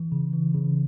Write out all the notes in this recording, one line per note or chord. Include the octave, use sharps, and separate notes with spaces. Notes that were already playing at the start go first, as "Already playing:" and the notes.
Already playing: E3
C#3
E3
C#3